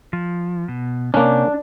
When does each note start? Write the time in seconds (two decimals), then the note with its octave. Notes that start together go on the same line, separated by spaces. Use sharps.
0.13 F3
0.68 B2
1.14 C3 A#3 C#4 D4